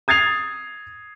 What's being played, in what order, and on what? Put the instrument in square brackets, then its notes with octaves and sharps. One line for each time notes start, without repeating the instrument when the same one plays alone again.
[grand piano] D#6 G#6 A6 C7 F7